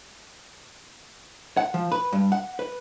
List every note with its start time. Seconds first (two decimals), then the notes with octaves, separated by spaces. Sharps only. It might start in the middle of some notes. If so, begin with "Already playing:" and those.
1.57 F#5
1.74 F3
1.92 B4
2.12 G2
2.32 F#5
2.59 B4